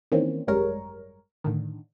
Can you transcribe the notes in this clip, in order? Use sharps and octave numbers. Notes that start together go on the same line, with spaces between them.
D#3 E3 A#3 C4 C#4
G#1 F#2 G3 G#3 A#4 C#5
A2 D3 D#3